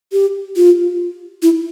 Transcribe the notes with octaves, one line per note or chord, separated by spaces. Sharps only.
G4
F4
E4